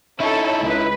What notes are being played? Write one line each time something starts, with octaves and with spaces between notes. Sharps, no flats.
C#4 D#4 E4 A4
C#2 B4